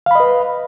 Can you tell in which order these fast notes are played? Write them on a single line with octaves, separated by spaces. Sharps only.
F5 B5 D#5 B4